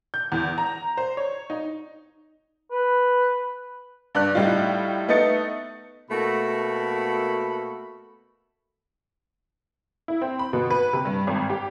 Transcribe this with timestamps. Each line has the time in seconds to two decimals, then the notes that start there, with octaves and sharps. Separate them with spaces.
0.14 G6
0.32 E2
0.58 A#5
0.97 C5
1.17 C#5
1.50 D#4
2.72 B4
4.15 G2 D5 F#6
4.35 A2 G3 D#4 F4
5.08 A3 B3 D#4 D#5 A6 C#7
6.10 B2 A3 A#3 F#4 A4 B5
10.08 E4
10.21 C4
10.39 B5
10.53 B2
10.70 B4
10.93 C3
11.05 G2
11.27 G#1
11.50 G4